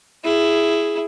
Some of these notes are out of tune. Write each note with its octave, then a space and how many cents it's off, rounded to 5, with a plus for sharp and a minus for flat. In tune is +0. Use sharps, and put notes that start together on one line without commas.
E4 +10 G#4 +0